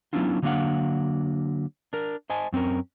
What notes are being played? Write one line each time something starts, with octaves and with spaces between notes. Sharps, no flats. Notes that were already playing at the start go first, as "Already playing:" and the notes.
F#3 B3 C#4 D4 E4 F4
D3 F#3 A#3 D4 F5 F#5
D4 A#4
C5 D#5 G#5 A5
F#2 C4 C#4 A#4